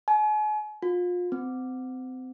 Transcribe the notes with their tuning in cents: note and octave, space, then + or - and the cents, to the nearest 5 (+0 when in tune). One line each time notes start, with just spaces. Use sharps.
G#5 +40
F4 +30
C4 -30